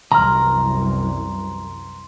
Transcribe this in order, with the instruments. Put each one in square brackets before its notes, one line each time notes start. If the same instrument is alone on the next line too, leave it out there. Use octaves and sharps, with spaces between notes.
[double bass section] C2 F#2 E3 [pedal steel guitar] A#5 F6 [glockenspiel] C6